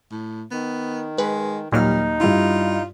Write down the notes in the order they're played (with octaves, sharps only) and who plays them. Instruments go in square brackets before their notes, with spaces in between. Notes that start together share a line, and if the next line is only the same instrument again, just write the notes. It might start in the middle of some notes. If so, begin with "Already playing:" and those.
[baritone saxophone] A2
[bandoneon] D#3 [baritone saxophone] B3
[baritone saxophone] G#3 [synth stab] B4
[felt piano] D#2 [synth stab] A#2 F#3 F6 [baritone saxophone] G3 [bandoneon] D#4
[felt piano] G2 E4 [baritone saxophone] F4